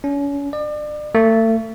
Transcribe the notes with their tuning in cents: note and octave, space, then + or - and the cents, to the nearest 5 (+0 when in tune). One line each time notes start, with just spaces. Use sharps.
C#4 +35
D5 +35
A3 +35